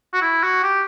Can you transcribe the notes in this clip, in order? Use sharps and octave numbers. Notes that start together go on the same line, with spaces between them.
F#4
E4
F#4
G4